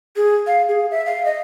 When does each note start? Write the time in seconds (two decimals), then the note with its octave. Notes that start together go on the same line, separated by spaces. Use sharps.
0.16 G#4
0.47 F5
0.69 G#4
0.91 E5
1.06 F5
1.25 D#5